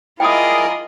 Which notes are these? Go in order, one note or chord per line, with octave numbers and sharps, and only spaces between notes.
E4 F4 G#4 A#4 D5 D#5 G5 D#6